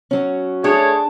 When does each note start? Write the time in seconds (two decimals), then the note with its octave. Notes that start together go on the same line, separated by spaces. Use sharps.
0.11 F#3 C#4
0.64 A3 D4 G#4 C#5